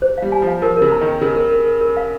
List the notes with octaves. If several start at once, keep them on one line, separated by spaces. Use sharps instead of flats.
C5
G3 F5
G#5
F3
F5
F3 A#4
C#3 A#4
A#5
D#3
G5
C#3 A#4
A#4
A#4
A#4
A#4
F5